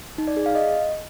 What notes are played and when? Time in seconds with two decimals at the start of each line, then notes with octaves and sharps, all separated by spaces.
0.18 D#4
0.27 D5
0.37 G#4
0.46 F5
0.55 D#5